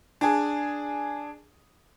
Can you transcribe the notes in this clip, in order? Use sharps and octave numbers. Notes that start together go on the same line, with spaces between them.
D4 G#4